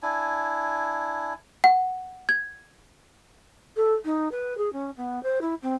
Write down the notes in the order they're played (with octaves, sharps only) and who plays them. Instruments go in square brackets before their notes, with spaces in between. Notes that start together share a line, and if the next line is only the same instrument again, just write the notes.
[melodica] D4 E4 G#5
[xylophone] F#5
G#6
[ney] A4
D#4
B4
G#4
C#4
B3
C5
E4
C4